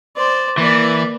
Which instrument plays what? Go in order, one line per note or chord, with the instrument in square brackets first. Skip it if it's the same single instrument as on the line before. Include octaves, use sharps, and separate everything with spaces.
[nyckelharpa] C5 D5
[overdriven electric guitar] E3 [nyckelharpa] A#3 D5